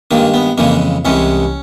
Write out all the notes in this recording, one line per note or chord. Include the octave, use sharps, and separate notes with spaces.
G2 D#3 G#3 A#3
B3
F2 C#3 E3 G#3 A#3
C2 C3 E3 G#3 C#4